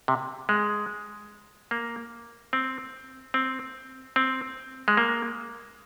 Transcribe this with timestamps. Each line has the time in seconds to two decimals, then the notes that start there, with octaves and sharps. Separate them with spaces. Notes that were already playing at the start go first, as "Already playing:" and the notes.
0.08 C3
0.49 G#3
1.71 A#3
2.53 C4
3.34 C4
4.16 C4
4.88 G#3
4.97 A#3